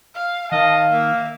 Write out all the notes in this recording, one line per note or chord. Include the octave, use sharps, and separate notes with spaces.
F5
D#3 D#5 F5 A5
A#3 E5